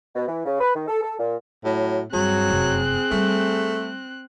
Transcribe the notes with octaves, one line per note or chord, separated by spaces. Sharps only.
B2
E3
C#3
B4
D#3
A4
A4
A#2
A2 F#3
G2 F#3 C4 G#4 F#6
F1 F#2
G3 A3